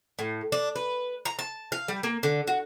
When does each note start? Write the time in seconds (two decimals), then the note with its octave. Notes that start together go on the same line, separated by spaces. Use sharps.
0.19 A2
0.52 D4
0.76 B4
1.25 A#5
1.39 A5
1.72 F5
1.88 G3
2.03 A#3
2.23 D3
2.47 F#4